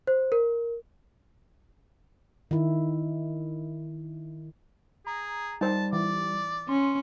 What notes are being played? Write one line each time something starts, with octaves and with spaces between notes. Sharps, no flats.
C5
A#4
D#3 E4
G#4 A#5
G3 D#4 C5 A5
E3 D5
C#4 C6